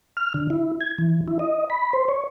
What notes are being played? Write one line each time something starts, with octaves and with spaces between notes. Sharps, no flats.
F6
D3
E4
G#6
E3
E4
D#5
B5
C5
C#5